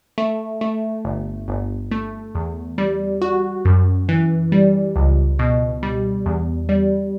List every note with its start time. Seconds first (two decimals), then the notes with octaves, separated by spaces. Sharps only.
0.18 A3
0.61 A3
1.05 G1
1.48 G1
1.91 A3
2.35 E2
2.78 G3
3.22 F#4
3.65 F#2
4.09 E3
4.52 G3
4.96 C#2
5.39 B2
5.83 G3
6.26 E2
6.69 G3